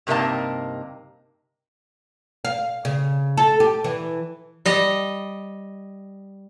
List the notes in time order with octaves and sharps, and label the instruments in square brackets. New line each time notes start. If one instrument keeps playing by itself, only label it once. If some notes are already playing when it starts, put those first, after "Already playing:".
[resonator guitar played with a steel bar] G2 C3 A#3 D#4 D#5 A5
[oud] F5
C#3
A4
G4
E3
[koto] G3 D#5